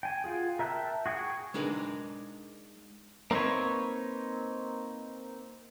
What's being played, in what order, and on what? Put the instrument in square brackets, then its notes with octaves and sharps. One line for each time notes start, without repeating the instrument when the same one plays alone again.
[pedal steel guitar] G5 G#5
F4 F#4 G#4
A#4 E5 G5 A5 F#6
F#4 G#4 G5 C#6
[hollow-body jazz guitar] G#3 D4 D#4 A#4 B4
[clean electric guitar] A#3 C4 D#4 B4 C#5